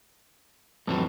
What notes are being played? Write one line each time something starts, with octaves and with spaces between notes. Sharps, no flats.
F2 A2 E3 F#3